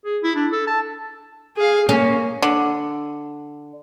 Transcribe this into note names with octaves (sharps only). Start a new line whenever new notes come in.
G#4
E4
D4
A4
A5
G#4 F5
A#3 C#4
D3